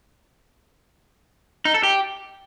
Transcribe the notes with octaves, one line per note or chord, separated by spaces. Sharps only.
D#4
A4
G4